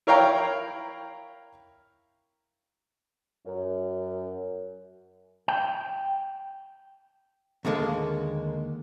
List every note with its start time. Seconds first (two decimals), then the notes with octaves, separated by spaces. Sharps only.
0.07 E4 A#4 C#5 F5 G5 A#5
3.46 F#2
5.48 G5
7.65 D#2 D3 G#3 A#3